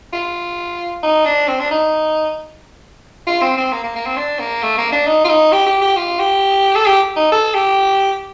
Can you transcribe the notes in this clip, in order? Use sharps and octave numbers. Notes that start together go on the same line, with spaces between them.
F4
D#4
D4
C4
D4
D#4
F4
C4
C4
A#3
A#3
A#3
C4
D4
A#3
A3
A#3
D4
D#4
F4
D#4
G4
G4
G4
F4
G4
A4
G4
D#4
A4
G4